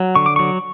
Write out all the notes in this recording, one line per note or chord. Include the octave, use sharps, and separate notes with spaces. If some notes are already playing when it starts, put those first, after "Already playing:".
Already playing: F#3
D3 C#6
D6
F#3 C#6